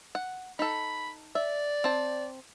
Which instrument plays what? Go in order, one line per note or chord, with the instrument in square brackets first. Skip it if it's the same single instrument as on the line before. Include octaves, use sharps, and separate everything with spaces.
[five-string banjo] F#5
[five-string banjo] D#4 A4 [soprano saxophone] B5
[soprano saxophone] D5 [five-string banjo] E5
[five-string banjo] C4 A5